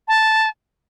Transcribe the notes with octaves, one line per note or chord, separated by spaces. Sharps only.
A5